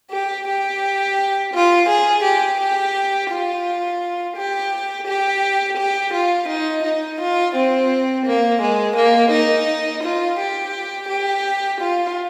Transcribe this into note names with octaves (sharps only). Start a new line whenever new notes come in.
G4
G4
F4
G#4
G4
G4
F4
G4
G4
G4
F4
D#4
D#4
F4
C4
A#3
G#3
A#3
D#4
F4
G4
G4
F4